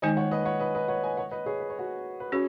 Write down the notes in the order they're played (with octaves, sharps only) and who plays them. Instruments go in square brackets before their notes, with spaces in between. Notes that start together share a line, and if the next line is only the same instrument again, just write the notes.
[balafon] D#3 G#3 D#4 [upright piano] D#5 G#5
[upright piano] C#5 F#5
B4 D#5
C#5 F#5
B4 D#5
B4 D#5
C#5 F#5
D#5 G#5
C#5 F#5
B4 D#5
G#4 C#5
B4
C#5
F#4 B4
B4
[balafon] C#4 F#4 [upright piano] G#4 C#5